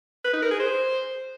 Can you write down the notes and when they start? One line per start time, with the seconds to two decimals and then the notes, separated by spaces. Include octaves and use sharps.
0.25 B4
0.33 D#4
0.42 A#4
0.51 G#4
0.60 C5